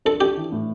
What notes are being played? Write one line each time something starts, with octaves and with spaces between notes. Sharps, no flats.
D4 A4
D4 G4
E3
A2